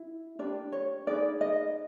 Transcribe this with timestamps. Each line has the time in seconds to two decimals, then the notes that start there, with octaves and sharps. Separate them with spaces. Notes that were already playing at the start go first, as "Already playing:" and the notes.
Already playing: E4
0.39 D4 G4 B4 D5
0.72 C#5
1.07 D#4 G#4 B4 D5
1.41 D#5